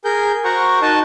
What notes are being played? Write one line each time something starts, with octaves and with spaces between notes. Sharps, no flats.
G#4 A#4 G6
F#4 A#4 C5 F#5 A#5 C#6
D#4 F#4 D#5 A5